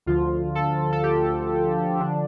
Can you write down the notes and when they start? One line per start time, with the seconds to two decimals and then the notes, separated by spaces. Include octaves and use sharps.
0.06 D2 D3 F3 F4
0.55 A4
0.93 A4
1.03 G4
2.00 D3 F3 D4